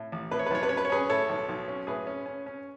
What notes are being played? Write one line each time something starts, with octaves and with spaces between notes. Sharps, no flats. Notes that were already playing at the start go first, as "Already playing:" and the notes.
Already playing: A2
A1
A2 B4
C#5
B4
B1 C#5
B4
C#4 C#5
B4
C#5
C#4 G#4 B4
A2 A4 C#5
B1
B1
C#4
A2 G#4 B4
C#4
C#4
C#4